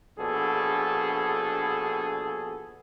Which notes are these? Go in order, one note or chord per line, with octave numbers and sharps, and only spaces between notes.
A#1 B2 D4 G#4 A4